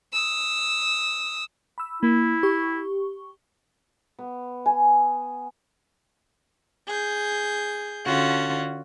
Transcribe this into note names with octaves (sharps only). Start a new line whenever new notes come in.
D#6 E6
B5 E6
A#3 E4
G4 C#6
B3
G#5
G#4 G6
D3 C#4 F4 F#4